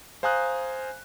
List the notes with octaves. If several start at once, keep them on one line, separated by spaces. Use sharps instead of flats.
C5 F5 G#5 A#5 D#6 F#6